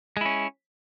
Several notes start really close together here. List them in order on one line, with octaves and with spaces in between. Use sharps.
G#3 E4 C#4